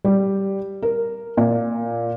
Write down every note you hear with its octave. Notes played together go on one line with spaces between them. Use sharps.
G3
A#4
A#2